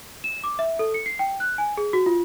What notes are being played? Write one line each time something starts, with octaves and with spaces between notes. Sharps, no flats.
E7
D6
E5
A4
C#7
C7
G5
F#6
G#5
G#4
F#4
F4